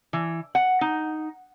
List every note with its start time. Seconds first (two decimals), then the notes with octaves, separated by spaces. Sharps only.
0.13 E3
0.55 F#5
0.81 D#4